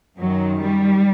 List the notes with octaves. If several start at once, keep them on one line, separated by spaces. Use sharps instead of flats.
F#2 D#3 F#3
G3